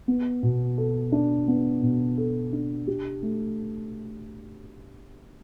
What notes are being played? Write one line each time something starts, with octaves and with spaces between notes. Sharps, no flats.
B3
B2
A4
D4
B3
B2
A4
D4
G4
A3